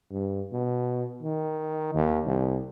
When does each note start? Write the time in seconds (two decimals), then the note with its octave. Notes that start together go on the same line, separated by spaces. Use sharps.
0.11 G2
0.52 B2
1.22 D#3
1.95 D#2
2.26 C2